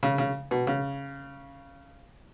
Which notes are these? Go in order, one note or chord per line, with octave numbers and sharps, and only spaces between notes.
C#3
C#3
B2
C#3